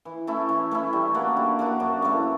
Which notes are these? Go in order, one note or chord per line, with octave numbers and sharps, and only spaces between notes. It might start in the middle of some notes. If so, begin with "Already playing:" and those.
E3
A3 C#4 E4
E3
A3 C#4 E4
G3
A#3 D4 F#4
G3
A#3 D4 F#4
F#2
C#3 E3 A3